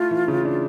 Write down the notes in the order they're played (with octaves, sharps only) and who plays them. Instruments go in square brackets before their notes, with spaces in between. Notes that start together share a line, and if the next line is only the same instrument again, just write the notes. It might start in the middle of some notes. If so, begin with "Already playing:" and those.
Already playing: [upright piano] A3 E4 [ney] F4
[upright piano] E3
C#3
D4